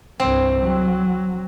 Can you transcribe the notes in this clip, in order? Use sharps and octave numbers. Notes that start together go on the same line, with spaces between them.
C2 G2 C4
F#3